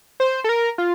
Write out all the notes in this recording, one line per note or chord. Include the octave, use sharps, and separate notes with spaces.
C5
A4
A#4
F4